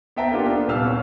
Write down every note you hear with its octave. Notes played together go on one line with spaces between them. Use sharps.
B3 C5 E5 G5 A5 A#5
A#3 B3 D4 F4 G4 A4
D4
D#1 C2 B3 F5 E6 F6
C#4